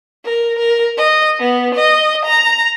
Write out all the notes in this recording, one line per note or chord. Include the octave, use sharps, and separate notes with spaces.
A#4
A#4
D#5
B3
D#5
A#5